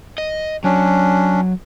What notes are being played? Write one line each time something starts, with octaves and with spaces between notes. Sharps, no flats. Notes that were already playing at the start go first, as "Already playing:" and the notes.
D#5
F#3 C#4 D4